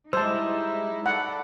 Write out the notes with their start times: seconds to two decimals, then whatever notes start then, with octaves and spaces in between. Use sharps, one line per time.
0.13 G3 G#3 D#4 E4 C5 A5 E6
1.06 A4 D5 F#5 B5